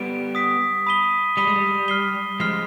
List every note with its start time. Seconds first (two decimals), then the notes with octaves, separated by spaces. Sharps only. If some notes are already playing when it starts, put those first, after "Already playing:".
Already playing: G3 B3 D7
0.35 D#6 B6 D7
0.87 B5 D#6 B6 D#7 G7
1.37 G3 B5 D#6 B6 D#7 G7
1.47 G#3
1.56 G3
1.88 F6 C7 G7
2.40 F3 G#3 F6 C7 G7